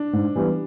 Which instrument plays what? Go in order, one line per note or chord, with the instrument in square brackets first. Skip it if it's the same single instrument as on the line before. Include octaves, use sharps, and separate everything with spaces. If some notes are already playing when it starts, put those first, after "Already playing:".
Already playing: [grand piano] D4
[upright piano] G#2
E3 G3 B3